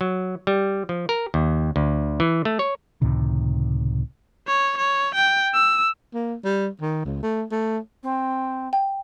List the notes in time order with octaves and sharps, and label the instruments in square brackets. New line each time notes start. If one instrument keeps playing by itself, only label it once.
[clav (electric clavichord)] F#3
G3
F3
A#4
D#2
D2
E3
A3
C#5
[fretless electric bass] C#2 A2 C3 D#3
[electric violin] C#5
C#5
G5
E6
[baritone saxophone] A#3
G3
D#3
C#2
A3
A3
[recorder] C4
[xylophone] G5